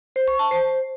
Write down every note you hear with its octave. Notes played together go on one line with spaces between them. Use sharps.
C5
C#6
A5
C5